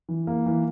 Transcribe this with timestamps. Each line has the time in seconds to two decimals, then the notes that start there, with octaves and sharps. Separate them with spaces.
0.09 E3
0.27 A#3
0.46 E3